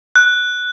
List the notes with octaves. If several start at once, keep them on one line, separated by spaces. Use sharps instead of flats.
F#6